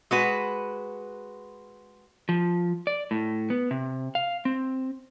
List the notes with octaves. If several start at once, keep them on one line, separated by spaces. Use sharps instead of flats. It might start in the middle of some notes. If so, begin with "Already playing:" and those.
G#3 F#4 B4
F3
D5
A2
B3
C3
F5
C4